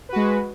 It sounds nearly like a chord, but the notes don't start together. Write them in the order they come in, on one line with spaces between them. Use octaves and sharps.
B4 F#4 G#3